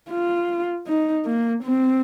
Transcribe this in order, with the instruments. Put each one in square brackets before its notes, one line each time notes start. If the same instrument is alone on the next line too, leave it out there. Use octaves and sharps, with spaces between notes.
[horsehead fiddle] F4
D#4
A#3
C4